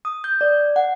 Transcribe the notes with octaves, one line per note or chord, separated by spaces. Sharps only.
D#6
G6
D5
F#5